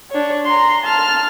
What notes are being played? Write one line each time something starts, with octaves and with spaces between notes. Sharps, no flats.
D4 C#5
A#5 C6
A5 F6